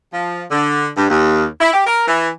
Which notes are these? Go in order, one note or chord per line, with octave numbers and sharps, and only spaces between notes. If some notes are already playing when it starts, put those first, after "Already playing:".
F3
D3
G2
D#2
E4
G4
A#4
E3